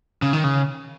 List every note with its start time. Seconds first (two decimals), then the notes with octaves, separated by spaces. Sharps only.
0.22 C#3
0.33 D#3
0.44 C#3